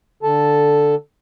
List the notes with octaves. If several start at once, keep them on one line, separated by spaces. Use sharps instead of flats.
D3 A4 A5